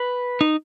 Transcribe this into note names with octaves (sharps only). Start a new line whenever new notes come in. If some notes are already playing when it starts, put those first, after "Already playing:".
Already playing: B4
D#4